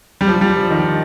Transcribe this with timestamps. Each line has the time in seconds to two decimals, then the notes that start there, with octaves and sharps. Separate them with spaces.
0.21 G3
0.28 F3
0.41 G3
0.56 F3
0.70 D#3